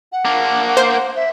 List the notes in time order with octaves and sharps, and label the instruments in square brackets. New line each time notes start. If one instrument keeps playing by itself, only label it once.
[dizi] F#5
[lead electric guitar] A#3 D4
[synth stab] C5
[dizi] E5